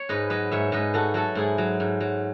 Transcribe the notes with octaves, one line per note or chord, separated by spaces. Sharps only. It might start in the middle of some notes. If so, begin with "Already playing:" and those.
Already playing: C#5
G#2 B4 D#5
F#3 B4 D#5
G#2 C#5 E5
G#2 B4 D#5
A3 F#4 A4
F#3 F#4 A4
G#2 E4 G#4
F#3
G#2
F#3